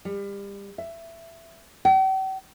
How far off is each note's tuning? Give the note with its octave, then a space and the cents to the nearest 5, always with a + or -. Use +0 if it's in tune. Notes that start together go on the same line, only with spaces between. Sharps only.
G3 +30
E5 +15
G5 -45